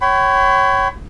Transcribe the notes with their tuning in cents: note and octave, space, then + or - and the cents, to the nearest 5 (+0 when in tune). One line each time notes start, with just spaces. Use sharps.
C#5 -5 G5 -40 B5 +35